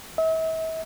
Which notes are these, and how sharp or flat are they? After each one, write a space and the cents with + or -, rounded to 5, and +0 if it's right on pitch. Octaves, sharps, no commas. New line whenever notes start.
E5 -40